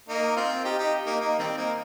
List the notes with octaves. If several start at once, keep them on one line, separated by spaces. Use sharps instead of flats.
A#3 D#4
C4 F4
D#4 G4
D#4 G4
A#3 D#4
A#3 D#4
D#3 G3 C4
A#3 D#4